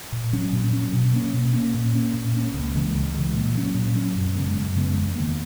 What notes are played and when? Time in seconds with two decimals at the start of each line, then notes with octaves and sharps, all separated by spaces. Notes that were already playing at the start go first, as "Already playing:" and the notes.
0.12 A#2
0.33 F#3 C#4
0.52 A#2
0.73 F#3 C#4
0.93 B2
1.13 A#3 C#4
1.33 B2
1.53 A#3 C#4
1.74 A#2
1.94 A#3 C#4
2.13 A#2
2.34 A#3 C#4
2.53 C#2
2.74 C#3 E3 G#3
2.95 C#2
3.14 C#3 E3 G#3
3.35 A#2
3.55 F#3 C#4
3.74 A#2
3.95 F#3 C#4
4.15 F#2
4.35 C#3 G#3 B3
4.55 F#2
4.76 C#3 G#3 B3
4.95 E2
5.15 D#3 A#3